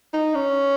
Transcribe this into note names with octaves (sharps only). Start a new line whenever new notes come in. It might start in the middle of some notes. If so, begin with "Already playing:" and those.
D#4
C#4